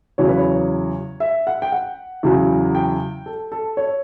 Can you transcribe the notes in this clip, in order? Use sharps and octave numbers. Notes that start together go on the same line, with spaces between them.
E2 C#3 F#3 C#5
B4
C#5
E5
F#5
G5
F#5
E2 C#3 F#3
G5
A4
A4
C#5